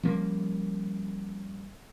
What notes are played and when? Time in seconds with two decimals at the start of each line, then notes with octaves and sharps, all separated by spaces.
0.03 F3 G3 A#3 C#4